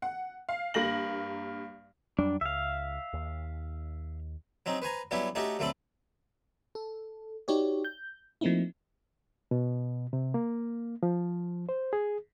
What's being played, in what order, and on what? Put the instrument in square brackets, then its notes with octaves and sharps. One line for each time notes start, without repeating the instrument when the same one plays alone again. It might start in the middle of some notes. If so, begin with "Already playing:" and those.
[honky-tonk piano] F#5
F5
G2 A#3 A#6 F#7
[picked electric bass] F2 F#3 G3 [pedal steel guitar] D4
[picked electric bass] C#2 [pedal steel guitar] E5 F5
[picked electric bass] D#2
[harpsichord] F#3 C4 C#4 D#4
B4 C5 G#5 A#5
F#3 G3 B3 C#4 E4 G4
A3 C#4 D#4 F#4 G4 A4
D2 F#3 A3 C4 A4 B5
[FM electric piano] A4
D#4 F#4 G4 C#5 D5
G6
F3 A3 A#3 C4 D#4 E4
[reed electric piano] B2
C3
A#3
F3
C5
G#4